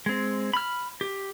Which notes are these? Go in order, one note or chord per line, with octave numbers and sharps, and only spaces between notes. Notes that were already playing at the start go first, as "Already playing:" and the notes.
G#3 C4
B5 F6
G4